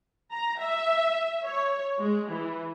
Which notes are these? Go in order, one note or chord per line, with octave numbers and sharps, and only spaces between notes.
A#5
E5
C#5
G#3
E3